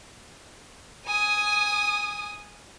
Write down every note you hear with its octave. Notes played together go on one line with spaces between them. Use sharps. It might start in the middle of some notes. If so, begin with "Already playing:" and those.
G#5 D#6